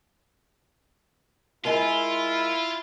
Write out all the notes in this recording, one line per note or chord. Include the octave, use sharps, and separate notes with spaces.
G#3 E4 F4 A#4 G#5